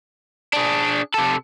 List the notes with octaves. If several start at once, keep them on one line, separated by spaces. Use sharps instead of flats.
D4 G#4
C3 A4